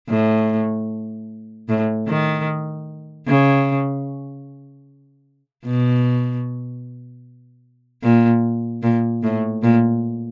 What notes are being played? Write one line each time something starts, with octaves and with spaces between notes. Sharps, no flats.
A2
A2
D#3
C#3
B2
A#2
A#2
A2
A#2